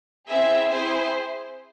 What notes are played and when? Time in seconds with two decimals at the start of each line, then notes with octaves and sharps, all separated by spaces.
0.28 C4 E4 G#4 E5
0.70 C4 E4 G#4 C5